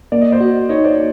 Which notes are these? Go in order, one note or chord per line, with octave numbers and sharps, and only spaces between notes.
A#3 D5
D#5
C5 D5
F#4
D#4 C#5 D#5
C5 D5